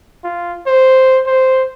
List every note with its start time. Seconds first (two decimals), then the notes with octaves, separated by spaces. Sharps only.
0.24 F4
0.67 C5
1.27 C5